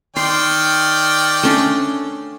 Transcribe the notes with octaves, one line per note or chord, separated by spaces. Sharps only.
D#3 D5 G5 C6
A3 C#4 D4